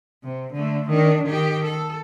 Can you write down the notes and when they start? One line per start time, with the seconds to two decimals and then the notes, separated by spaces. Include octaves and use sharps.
0.23 C3
0.53 D3 A3
0.90 D#3 D4
1.24 D#3 G4
1.65 A4